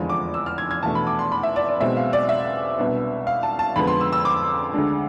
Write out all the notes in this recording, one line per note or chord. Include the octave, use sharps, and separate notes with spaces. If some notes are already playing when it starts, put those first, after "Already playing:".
Already playing: F1 E2 D3 F3 G#3
D6
E6
F6
G#6
G#6
E2 B2 A3 D4 A5
B5
D6
C6
B5
E5
D5
D5
B1 B2 G#3 C4 E5
F5
D5
E5
C2 B2 B3 D4
F5
A5
A5
F2 D3 G#3 B3 B5
C6
E6
E6
D6
D2 D3 G#3 D4